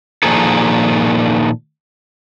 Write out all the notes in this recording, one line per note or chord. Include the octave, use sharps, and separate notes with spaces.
A#2 D#3 F3 A#3 G#4 A4